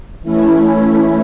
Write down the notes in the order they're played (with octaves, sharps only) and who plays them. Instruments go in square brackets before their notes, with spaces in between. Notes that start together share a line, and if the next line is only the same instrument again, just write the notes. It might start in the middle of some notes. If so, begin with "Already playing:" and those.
[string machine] E3 A3 C#4 E4